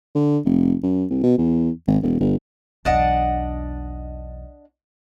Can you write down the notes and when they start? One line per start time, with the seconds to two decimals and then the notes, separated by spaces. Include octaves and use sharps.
0.15 D3
0.45 F1
0.83 F#2
1.11 C2
1.23 B2
1.38 E2
1.87 G#1
2.03 E1
2.20 G1
2.85 B1 E2 D4 D#5 F#5